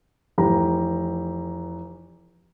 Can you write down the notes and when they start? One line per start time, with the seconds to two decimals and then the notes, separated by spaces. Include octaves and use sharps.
0.38 F1 E3 G4 A#5